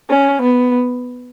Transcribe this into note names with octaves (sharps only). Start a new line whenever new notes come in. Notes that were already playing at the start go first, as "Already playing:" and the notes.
C#4
B3